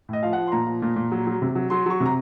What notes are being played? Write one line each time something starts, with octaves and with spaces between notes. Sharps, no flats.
A2 D#5
F3 F5
F3 F#5
C6
A#2 A#5
F3
A#2
A#2
F#3
F#3
C3
F#3
F#3 C6
F#3 C#6
C3
A#5